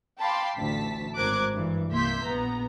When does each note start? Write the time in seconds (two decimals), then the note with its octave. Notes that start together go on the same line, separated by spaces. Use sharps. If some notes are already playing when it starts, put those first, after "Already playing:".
0.19 F5 G5 A5 B5 C6 D6
0.56 A1 D2 A5 B6
1.17 G#1 A#4 C5 D6 F#6 G#6
1.53 G2 E3
1.91 C2 A#3 E5 C6 G6 B6
2.23 A#1 B3 A#5